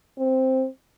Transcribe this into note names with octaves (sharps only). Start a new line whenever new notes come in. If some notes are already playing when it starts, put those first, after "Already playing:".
C4